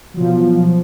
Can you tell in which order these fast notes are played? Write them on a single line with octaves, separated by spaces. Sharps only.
F#3 F3 B2